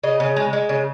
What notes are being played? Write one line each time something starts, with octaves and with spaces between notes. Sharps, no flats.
C#3 D#5
C#3
G#3
G#3
C#3